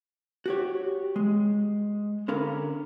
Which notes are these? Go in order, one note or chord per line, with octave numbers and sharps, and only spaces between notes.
F#4 G4 C#5
G#3
D3 C#4 A#4 F5 B5